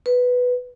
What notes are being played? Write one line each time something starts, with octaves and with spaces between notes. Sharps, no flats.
B4